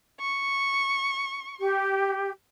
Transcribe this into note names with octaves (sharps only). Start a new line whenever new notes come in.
C#6
G4